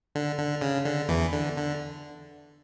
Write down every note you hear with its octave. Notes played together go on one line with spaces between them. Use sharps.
D3
D3
C#3
D3
E2 E3
D3
D3